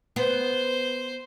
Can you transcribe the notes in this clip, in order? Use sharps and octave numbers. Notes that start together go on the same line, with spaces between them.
B3 C5